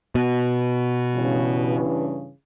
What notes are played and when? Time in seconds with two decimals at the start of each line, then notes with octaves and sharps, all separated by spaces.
0.15 B2
1.14 G2 C#3 E3